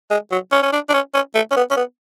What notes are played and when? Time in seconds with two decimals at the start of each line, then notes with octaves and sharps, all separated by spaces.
0.11 G#3
0.32 F#3
0.52 C#4
0.63 C#4
0.73 D4
0.89 D4
0.94 C#4
1.14 C#4
1.35 A3
1.51 C#4
1.56 B3
1.71 C#4
1.77 B3